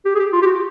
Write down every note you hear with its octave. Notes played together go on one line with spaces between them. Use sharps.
G4
G#4
G4
F4
G4
F#4